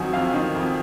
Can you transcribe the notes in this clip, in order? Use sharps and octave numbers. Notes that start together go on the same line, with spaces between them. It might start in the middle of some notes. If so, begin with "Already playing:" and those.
Already playing: F2 D#3 F#3 G#5
F2 F5
D#3
F2